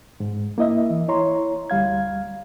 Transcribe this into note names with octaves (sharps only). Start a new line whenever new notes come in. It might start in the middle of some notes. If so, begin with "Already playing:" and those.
G#2
A#3 E4 D#5 E5
E3
E4 C#5 A#5 C6
D2 G3 F5 G#6